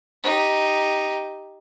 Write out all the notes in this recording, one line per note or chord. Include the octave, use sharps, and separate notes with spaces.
D#4 G4